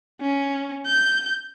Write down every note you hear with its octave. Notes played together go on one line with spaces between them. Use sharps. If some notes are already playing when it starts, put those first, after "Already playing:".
C#4
G6